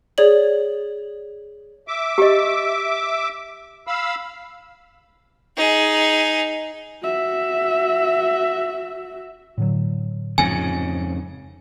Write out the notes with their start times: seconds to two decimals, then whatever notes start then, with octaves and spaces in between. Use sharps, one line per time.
0.18 G#4 C#5 D5 F#7
1.88 E5 D6
2.18 G4 D#5
3.87 F5 B5 E6
5.56 D#4 G#4
7.03 F#4 E5
9.58 A2 D3 F#3
10.38 F2 G#2 C#3 G#5